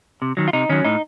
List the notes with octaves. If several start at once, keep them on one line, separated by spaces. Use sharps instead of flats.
C3
D#3 F#3
F4
C3 D#4
D#3 F#3 C#4
A2 D#4